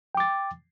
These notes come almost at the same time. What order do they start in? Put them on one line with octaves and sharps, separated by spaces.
G5 D6 A6